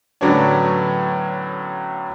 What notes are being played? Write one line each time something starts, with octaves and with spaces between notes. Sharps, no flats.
A2 D3 F#3 B3 C#4 D4